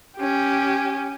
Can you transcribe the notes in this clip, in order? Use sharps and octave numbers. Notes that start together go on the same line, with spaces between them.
C#4 G4